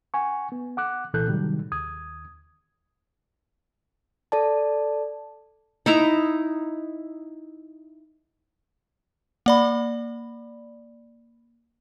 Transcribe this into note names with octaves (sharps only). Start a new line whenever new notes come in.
F#5 G#5 C#6
B3
F#5 D6 F#6
C2 A#2 E3 A4 F#6 G6
A2 C3 D#3 F#3 G3
D#2 D#6 G#6
A4 D5 A5
D#4 E4 A#5
A#3 D5 B5